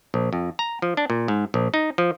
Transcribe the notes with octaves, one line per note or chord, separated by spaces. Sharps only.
A#1
F2
A#5
F3
D4
A#2
G#2
A#1
D#4
F3